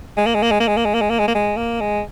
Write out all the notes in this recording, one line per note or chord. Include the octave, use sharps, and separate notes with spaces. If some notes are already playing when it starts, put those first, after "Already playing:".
G#3
A#3
G#3
A#3
G#3
A#3
G#3
A#3
G#3
A#3
G#3
A#3
G#3
A#3
G#3
A#3
G#3